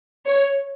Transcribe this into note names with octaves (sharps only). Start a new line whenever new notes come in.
C#5